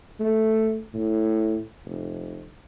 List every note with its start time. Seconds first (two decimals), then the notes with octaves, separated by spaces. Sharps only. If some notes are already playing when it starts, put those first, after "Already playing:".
0.20 A3
0.94 A2
1.85 F1